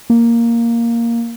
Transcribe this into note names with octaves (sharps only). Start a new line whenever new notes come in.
A#3